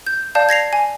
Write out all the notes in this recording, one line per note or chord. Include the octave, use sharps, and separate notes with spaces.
G6
D5 F5 A5 G6
G#6 A#6 C7 F7
G#5